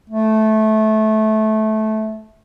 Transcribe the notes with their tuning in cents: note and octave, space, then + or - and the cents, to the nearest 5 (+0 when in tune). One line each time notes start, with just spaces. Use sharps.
A3 -15